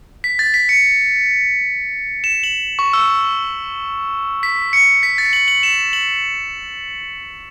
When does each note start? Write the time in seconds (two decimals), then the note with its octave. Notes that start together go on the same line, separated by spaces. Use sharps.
0.24 B6
0.39 A6
0.54 B6
0.69 C#7
2.24 E7
2.43 F#7
2.79 C#6
2.93 E6
4.43 B6
4.73 C#7
5.03 B6
5.18 A6
5.33 F#7
5.48 F#7
5.63 E7
5.93 F#7